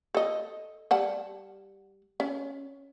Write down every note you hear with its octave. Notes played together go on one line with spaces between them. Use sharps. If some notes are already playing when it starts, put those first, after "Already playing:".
A4 D#5
G3 F#5 A5
C#4